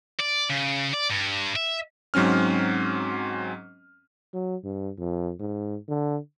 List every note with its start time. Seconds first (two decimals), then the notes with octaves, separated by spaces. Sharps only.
0.19 D5
0.50 C#3
0.93 D5
1.10 G2
1.56 E5
2.14 G#2 F#3 C4 C#4 F6
4.34 F#3
4.64 G2
4.98 F2
5.40 G#2
5.88 D3